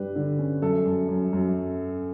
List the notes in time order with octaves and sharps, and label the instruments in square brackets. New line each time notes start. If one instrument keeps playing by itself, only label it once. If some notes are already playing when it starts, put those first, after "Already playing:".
Already playing: [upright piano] G2 G3 B4
D3
C#4
F#2 A4
F#2
F#2
F#2